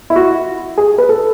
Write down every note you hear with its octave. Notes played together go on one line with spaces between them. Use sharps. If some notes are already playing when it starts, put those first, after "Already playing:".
E4
F#4
G#4
B4
A4